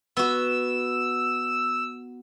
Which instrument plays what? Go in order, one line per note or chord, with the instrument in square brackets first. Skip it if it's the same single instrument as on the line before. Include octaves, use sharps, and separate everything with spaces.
[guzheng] B3 F#4 [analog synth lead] E6